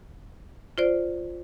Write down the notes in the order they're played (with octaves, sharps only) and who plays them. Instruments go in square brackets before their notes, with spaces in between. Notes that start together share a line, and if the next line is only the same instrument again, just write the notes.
[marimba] F4 C5 D5